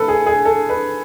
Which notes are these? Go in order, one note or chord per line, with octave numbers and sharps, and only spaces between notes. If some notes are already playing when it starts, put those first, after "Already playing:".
Already playing: A2 A4 B4
G#4
G#4
A4
B4